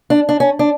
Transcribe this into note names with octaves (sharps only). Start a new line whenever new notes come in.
D4
D4
C#4
D4